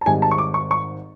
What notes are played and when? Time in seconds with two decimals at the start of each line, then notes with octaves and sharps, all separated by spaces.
0.01 A5
0.06 G#1 G#2 D#3 G3 G#5
0.22 A5
0.31 C#6
0.38 D6
0.54 C#6
0.71 C#6